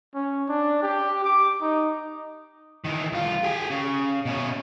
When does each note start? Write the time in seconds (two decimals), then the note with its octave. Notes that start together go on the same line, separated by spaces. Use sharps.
0.14 C#4
0.49 D4
0.82 G4
1.24 D6
1.61 D#4
2.84 D#3 E3
3.12 C2 F4
3.43 G4 G#4
3.70 C#3
4.25 B2 C#4